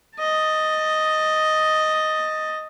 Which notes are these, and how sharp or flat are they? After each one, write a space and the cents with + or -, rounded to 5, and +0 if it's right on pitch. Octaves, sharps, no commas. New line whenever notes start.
D#5 +0 A5 +20